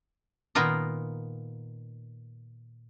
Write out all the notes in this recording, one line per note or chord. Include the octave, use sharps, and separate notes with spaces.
A#2 D#3 B3 F4 A#4 D#5